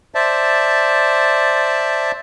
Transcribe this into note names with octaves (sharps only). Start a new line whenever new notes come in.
C5 D5 E5 A5